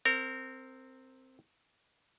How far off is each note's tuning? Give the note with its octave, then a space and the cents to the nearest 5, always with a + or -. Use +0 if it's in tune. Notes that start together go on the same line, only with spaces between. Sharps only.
C4 +0 A#4 -25